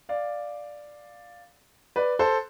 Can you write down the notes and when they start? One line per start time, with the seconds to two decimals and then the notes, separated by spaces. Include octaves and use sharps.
0.09 D5 F5
1.96 B4 D5
2.19 A4 C5